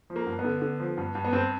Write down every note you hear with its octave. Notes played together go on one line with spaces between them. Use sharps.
F3
A#3
G2
B3
D3
D3
F3
G2
G2
B3
G2 C4